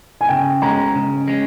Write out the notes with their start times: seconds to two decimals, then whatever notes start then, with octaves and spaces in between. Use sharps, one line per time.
0.21 G#5
0.29 C#3 G5
0.62 G#3 C#4 A#5
0.95 C#3
1.28 G#3 C#4